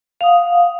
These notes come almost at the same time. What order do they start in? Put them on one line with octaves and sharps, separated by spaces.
F5 D#6 F#5